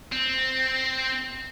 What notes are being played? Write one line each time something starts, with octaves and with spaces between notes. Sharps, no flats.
C4